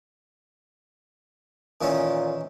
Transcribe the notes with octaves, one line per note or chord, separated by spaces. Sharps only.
A#2 D#3 E3 C#4